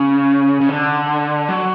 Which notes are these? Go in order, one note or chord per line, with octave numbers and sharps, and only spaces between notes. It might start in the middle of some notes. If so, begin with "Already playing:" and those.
Already playing: C#3
C#3
D3
F#3